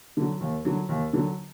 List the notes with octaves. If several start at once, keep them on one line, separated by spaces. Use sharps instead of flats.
D3 F#3
D#2
D3 F#3
D#2
D3 F#3